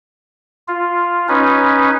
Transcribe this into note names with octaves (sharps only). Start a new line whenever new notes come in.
F4
C#4 D#4 B4